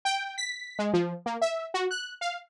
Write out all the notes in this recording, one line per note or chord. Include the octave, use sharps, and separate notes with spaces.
G5
B6
G#3
F3
A#3
E5
F#4
F#6
F5